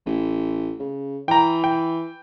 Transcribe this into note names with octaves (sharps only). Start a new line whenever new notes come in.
A1
C#3
E3 G5 A#5
G5